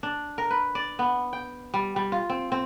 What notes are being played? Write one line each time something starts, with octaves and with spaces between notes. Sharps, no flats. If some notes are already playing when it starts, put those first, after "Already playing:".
D4
A#4
B4
D5
B3
G5
G3
G3
F4
C4
C4